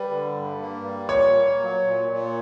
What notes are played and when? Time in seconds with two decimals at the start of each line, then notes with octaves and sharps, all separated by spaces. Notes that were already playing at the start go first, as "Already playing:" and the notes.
Already playing: G3 B4
0.09 D3
0.34 G2
0.59 A#3
0.84 G3
1.09 A#2 C#5
1.34 A#3
1.59 F#3
1.84 A#2
2.09 A#2